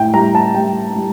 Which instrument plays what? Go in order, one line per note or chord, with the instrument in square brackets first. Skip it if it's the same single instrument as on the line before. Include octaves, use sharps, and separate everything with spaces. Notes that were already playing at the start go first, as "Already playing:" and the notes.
Already playing: [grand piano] A2 G5
G3 A#5
A5
G3 G5
G3